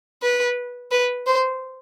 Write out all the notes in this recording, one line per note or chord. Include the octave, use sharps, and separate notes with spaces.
B4
B4
C5